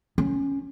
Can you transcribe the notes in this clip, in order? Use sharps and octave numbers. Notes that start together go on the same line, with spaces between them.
C#4